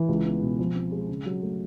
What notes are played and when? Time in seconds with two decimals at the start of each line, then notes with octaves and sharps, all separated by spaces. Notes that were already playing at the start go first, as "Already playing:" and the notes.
Already playing: E3
0.09 C#2
0.26 B3
0.42 B2
0.59 F3
0.75 C4
0.92 G#3
1.09 C#3
1.26 F#3
1.43 A3